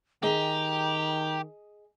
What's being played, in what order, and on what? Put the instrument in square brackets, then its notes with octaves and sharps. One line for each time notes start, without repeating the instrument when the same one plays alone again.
[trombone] D#3 [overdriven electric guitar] G4 [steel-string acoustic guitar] G#4 D#5 G#5 [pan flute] A#5